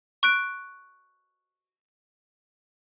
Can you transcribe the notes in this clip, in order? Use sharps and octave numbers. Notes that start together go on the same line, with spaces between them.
C#6 F#6 D7